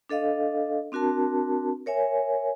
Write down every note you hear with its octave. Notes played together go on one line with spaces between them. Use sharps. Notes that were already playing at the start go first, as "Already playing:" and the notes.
D4 A4 D#5 F5
C4 D4 F#4 A#4 A5
A#4 C#5 E5 G#5